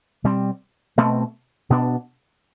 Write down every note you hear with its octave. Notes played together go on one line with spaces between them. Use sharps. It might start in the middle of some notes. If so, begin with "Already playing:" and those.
B2 G3 C4
B2 A3 C4
B2 B3 D4